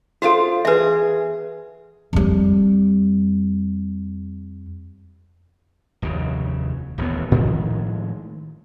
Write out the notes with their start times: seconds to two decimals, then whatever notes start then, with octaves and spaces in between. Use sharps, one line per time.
0.22 F4 F#4 A4 C5 F5
0.65 E2 G#4 B4 E5
2.13 F2 G3
6.02 F1 D#2 C#3
6.98 D#1 A1 D#2 B3
7.32 A2 D#3 F3 G#3